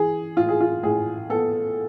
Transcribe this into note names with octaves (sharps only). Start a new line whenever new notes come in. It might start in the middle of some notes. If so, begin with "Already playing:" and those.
Already playing: E3 G#4
A2 F4
G#4
F4
A2 G#4
B3 A4